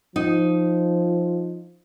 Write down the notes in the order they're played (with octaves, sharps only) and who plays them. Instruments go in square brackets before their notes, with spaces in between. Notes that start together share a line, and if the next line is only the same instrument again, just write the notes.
[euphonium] F3 [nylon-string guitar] D#4